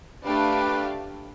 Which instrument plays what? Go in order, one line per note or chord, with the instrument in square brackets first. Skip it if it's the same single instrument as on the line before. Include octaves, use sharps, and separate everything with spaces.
[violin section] A3 D4 G4 D5 F5 [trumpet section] B4